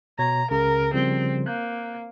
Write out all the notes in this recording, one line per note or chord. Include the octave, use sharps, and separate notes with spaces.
B2 C#5 A#5 G#6
C#2 C#3 A#4
C#3 F3 G3 C4
A#3 F#6 G6